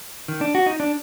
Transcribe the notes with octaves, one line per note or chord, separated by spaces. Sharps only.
D#3
D4
F#4
D#4
D4